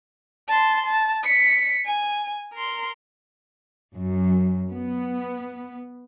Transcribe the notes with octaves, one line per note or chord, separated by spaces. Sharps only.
A5 C6
A5
B6 C#7
G#5
A#4 C6
F#2
B3